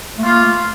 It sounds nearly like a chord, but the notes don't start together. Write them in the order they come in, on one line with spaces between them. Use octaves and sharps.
A3 A#3 F4